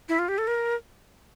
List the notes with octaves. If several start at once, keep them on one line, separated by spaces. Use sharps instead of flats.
E4
F4
G4
A4
A#4